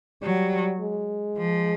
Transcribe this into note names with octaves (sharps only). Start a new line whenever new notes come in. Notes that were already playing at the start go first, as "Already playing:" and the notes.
F#3 G3
G#3
F3